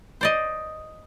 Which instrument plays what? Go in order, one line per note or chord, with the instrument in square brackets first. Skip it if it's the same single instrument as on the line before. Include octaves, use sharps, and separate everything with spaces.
[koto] C5 D5 D#5